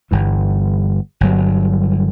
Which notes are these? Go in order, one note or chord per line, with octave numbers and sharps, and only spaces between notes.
G1 G2 E3
G1 G2 F#3